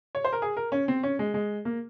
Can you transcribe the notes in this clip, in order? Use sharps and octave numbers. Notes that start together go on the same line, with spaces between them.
C#5
C5
A#4
G#4
A#4
C#4
C4
C#4
G#3
G#3
A#3